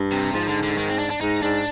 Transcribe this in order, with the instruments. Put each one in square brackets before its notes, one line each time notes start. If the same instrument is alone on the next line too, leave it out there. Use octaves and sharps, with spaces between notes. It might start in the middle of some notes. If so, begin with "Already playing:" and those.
Already playing: [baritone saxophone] G2
[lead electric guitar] C3
[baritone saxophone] G#2 [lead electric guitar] F3
[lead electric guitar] D3
D3
D#3
C4
D4
D4
[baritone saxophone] G#2 [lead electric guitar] D#4
[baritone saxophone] G#2 [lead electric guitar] D4